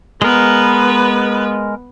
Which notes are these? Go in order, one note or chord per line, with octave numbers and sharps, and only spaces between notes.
G#3 B3 A#4 B4